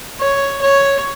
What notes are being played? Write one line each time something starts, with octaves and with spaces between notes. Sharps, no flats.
C#5
C#5